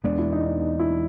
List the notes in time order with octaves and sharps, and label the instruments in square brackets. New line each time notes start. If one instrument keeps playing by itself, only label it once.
[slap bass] E2 B2 G#3 B3 [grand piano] D4
[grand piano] E4
D#4
D4
D#4
E4